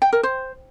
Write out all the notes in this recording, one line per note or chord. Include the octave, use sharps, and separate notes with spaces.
G5
A#4
C5